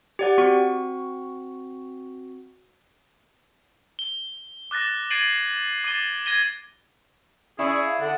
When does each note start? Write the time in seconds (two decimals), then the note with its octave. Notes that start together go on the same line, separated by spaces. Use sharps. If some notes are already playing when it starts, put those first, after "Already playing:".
0.19 G4 D5 F#5
0.38 C4 F#4 C#6
3.99 G7
4.71 D6 F#6 A6 A#6
5.10 G#6 A6 C7 D7 D#7 F#7
5.84 D6 A6 D#7 G7
6.26 G#6 A#6 D#7 G7
7.59 C#4 E4 G#4 D5
7.86 F5
8.00 D3 D4 F#5